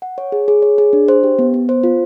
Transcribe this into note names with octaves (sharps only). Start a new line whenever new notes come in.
F#5
C#5
G#4
G#4
C#5
G#4
D4
C5
G4
B3
B3
C5
F4